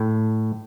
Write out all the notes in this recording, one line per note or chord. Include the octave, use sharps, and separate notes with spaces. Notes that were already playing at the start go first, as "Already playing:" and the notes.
Already playing: A2